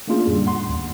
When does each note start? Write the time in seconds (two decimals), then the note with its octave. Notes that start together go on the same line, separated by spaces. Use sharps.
0.07 A3 A#3 C#4 D4 F4 G#4
0.27 F2 A2 D3 G3
0.47 F#5 C6
0.69 D#2